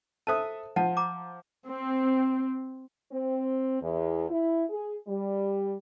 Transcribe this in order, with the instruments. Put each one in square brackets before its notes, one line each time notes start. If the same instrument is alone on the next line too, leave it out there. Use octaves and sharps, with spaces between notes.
[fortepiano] A4 E5 D#6 [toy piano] C5 A5
[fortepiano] F3 [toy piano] F#5 A5
[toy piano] A#5 D6
[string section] C4
[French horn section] C4
E2
E4
G#4
G3